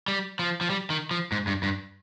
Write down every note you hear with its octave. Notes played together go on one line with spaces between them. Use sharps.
G3
F3
F3
G3
D#3
F3
G#2
G2
G2